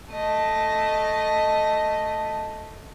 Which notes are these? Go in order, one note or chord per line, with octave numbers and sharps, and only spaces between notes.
A3 D#5